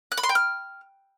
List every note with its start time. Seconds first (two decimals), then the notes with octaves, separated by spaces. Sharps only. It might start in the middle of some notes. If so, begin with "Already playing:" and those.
0.12 F#6
0.17 B5
0.23 C6
0.29 G5
0.35 F6